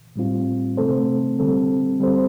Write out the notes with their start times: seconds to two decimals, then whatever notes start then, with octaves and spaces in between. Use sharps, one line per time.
0.16 A2 G3 C4 F4
0.77 C3 A3 C4 A4 C5
1.39 D3 G3 C4 A4
2.00 G3 C4 A4 C5